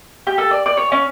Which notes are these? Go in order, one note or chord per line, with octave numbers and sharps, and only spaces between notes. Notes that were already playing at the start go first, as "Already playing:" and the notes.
G4
A4
D5
D5
C#5
C#4